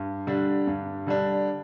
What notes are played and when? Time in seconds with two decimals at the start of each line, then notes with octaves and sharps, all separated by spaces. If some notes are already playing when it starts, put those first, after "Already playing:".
Already playing: G2
0.27 D3 G3 D4
0.67 G2
1.07 D3 G3 D4